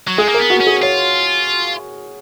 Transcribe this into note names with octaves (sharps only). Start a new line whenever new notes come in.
F#3
G#3 G#4
A#3
A#4
B3
F#4
C#4
G#4
F4 C#5